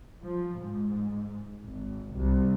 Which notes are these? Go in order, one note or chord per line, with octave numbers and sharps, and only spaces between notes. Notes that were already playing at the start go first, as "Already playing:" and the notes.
F3
G#2
G#1
C2